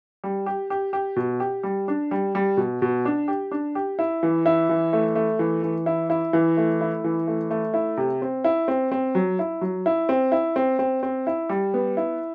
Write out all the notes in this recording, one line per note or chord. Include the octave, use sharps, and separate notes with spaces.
G3
G4
G4
G4
B2
G4
G3
D4
G3
G3
B2
B2
D4
G4
D4
G4
E4
E3
E4
E3
A3
A3
E3
E3
E4
E4
E3
A3
E4
E3
A3
A3
E4
C3
C4
E4
C4
C4
F#3
E4
F#3
E4
C4
E4
C4
C4
C4
E4
G3
B3
E4